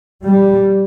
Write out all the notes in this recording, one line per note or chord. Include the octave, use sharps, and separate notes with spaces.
G3